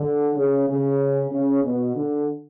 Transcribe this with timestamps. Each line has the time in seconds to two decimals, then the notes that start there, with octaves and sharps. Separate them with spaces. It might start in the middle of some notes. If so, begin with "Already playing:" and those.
Already playing: D3
0.36 C#3
0.68 C#3
1.31 C#3
1.64 B2
1.95 D3